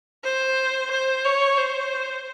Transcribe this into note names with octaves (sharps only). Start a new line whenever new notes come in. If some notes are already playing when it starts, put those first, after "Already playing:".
C5
C5
C#5
C5